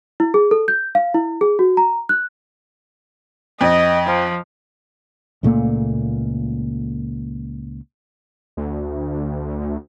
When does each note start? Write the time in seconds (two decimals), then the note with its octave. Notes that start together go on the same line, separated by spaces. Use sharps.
0.20 E4
0.34 G#4
0.51 A4
0.68 G6
0.95 F5
1.14 E4
1.41 G#4
1.59 F#4
1.77 A#5
2.09 F#6
3.61 F2 D#5
4.07 F3
5.43 C#2 A#2 A3 A#3
8.57 D2